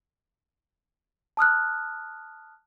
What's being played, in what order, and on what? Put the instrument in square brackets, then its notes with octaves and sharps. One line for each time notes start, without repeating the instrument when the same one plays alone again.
[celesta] A5 D#6 F6 F#6